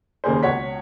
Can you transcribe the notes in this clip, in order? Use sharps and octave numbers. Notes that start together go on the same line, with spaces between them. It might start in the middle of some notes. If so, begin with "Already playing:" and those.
D#2 C#3 A#3 G#4 C5
C#2 B2 C#5 F#5 B6